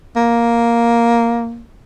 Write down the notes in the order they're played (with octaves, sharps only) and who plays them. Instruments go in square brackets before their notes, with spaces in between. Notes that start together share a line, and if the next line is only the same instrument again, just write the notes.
[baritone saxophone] A#3